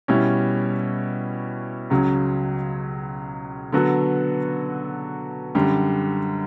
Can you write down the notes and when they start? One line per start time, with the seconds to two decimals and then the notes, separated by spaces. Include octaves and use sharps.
0.08 B2 G3 C#4 E4
1.90 C#2 C#3 F#3
3.72 D3 F#3 B3 F#4 A4
5.55 F#2 D3 G3